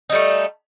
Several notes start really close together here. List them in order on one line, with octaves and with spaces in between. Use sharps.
D#4 G3 A3